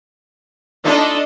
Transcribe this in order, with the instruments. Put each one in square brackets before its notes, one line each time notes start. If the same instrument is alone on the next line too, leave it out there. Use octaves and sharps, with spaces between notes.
[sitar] A3 D#4 F4 [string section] D4 A4 D#5